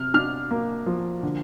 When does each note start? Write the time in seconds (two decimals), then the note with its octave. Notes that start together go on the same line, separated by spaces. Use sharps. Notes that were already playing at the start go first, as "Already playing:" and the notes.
Already playing: C3 F6
0.14 D4 F6
0.51 A#3
0.86 F3
1.23 D3